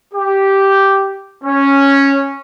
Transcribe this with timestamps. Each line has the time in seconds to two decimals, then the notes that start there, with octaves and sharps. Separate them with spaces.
0.14 G4
1.44 C#4